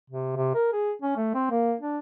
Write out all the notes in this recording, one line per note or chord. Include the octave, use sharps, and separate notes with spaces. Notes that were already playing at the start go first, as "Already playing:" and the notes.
C3
C3
A#4
G#4
C#4
A3
C4
A#3
D4